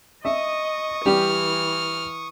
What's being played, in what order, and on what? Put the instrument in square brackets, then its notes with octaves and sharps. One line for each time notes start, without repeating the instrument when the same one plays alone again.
[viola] D#5 [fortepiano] E5 [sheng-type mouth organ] C#6 D#6
[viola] E3 [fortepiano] G3 G4 [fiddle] F6